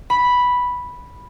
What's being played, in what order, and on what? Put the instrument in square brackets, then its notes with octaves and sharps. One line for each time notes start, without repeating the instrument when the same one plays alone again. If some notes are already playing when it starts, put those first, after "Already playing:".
[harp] B5